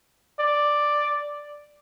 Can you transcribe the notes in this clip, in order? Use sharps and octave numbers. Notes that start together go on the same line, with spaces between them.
D5